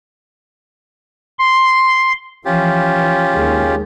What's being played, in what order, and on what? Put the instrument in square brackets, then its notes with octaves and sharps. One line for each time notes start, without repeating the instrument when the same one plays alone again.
[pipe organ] C6
[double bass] E3 F3 [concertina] C#4 F4 G4
[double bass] D#2 G#3